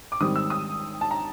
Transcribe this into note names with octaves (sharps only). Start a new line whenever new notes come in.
D6
G#2 D#3 G3 C4 D#6
E6
D#6
A5
A#5